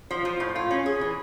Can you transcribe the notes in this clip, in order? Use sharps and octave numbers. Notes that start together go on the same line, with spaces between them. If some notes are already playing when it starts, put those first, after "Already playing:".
F3
F3
A2
F4
C#4
G#4
E3